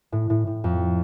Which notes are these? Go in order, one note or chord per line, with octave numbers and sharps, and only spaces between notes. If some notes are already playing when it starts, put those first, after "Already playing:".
A2
A2
A2
F2